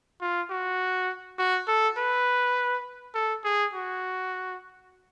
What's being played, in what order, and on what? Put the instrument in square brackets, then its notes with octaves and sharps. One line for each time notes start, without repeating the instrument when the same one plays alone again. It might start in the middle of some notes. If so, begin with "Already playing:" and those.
[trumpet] F4
F#4
F#4
A4
B4
A4
G#4
F#4